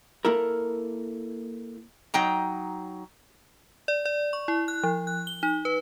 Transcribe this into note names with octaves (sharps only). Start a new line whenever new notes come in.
A#3 E4 A4 A#4
F#3 D#4 G5 A#5
D5
D5
C#6
E4
F#6
F3
F#6
G7
D#4
B4